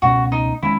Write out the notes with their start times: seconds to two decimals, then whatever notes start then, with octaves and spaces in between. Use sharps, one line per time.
0.02 C#2 B2 A3 C#4 F#4
0.32 D#4
0.63 D#3 G#3 C#4 E4